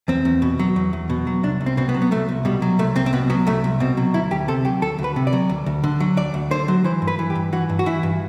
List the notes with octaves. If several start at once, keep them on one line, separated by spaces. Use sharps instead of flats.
E2 C4
E2
B2
F#3
E2
E2
B2
F#3
C2 D4
C2
C4
B2 C4
B3
F#3
B3
C2 A3
C2
B2 G3
F#3
C2 A3
C2 C4
C4
B2 B3
F#3 B3
C2 A3
C2
B2 C4
F#3
D2 E4
D2 G4
C3 A4
F#3 G4
D2 A4
D2
B4
C3
D5
F#3
D2
D2
D3
F#3
D2 D5
D2
D3 C5
F#3
E3 C5
G2
B4
E3
G4
G2
E3 F#4
G2
F#4
E3 E4
G2